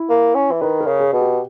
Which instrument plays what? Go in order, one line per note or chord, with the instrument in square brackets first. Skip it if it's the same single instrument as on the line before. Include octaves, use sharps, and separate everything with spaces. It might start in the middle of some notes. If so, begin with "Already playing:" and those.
Already playing: [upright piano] E4
[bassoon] A#3
C#4
E3
[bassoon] D#3 [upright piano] B4
[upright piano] A#4
[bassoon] C#3
[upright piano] G#4
[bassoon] B2
[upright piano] G4